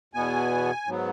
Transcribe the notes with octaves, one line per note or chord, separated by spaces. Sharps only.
E2 B2 B3 G#5
G#2 F#3 B3